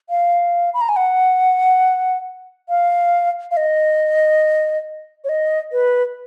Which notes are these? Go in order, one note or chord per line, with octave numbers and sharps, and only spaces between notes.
F5
B5
A#5
G#5
F#5
F5
F5
D#5
C#5
D#5
B4